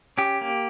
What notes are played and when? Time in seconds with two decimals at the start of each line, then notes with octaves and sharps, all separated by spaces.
0.18 C#4 G4
0.41 A#3